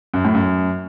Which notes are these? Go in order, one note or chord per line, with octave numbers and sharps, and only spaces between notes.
F#2
A2
F#2